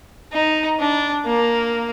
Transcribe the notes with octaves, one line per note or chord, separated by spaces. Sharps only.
D#4
D4
A#3